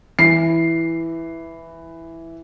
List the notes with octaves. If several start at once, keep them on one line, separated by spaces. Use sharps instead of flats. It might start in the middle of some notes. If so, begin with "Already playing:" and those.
E3 C7